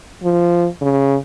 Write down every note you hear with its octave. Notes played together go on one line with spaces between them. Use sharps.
F3
C#3